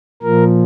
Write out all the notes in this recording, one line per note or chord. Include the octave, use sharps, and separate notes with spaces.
A#2 F3 A#4